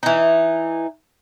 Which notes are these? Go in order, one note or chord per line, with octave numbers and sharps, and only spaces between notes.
E3 D#4